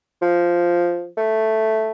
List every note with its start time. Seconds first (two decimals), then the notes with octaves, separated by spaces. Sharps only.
0.22 F3
1.17 A3